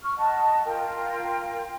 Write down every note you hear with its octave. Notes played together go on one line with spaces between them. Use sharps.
C#6 F6
D#5 F#5 A5
F4 A#4 G5